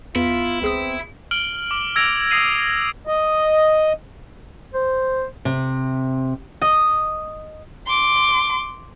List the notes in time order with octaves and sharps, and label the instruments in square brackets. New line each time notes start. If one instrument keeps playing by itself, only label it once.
[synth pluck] E2 [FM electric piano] B3 [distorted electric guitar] E4 [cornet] F4
[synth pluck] C#2 G#4 D#6 [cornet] C4
[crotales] F6 D7 F#7 G7
D6
E6 G#6 A#6 D7 F7
D#6 A#6 C7 D#7 F#7
[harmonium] D#5
[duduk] C5
[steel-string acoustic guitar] C3
[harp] D#5
[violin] C6 D6